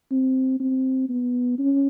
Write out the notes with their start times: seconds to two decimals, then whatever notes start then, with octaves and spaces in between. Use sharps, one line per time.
0.11 C4
0.60 C4
1.09 B3
1.59 C#4